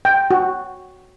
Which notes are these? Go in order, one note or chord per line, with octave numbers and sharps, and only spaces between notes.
G5
F#4